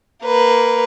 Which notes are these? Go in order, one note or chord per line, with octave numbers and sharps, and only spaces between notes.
A#3 B4